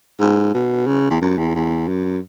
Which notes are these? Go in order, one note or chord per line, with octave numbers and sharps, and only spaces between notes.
G#2
B2
C#3
E2
F#2
E2
E2
F#2